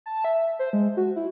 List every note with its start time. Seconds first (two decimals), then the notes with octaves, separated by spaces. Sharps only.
0.06 A5
0.24 E5
0.59 C5
0.73 G#3
0.97 F#4
1.16 E4